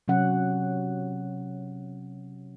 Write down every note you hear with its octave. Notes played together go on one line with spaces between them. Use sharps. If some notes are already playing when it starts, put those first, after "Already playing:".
C3 F#3 C#4 F#5